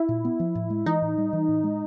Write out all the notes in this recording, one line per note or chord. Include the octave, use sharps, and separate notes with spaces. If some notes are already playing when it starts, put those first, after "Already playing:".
Already playing: E4
A#2
B3
F3
A2
G#3
E3 D#4
A2
G3
E3
A2
G#3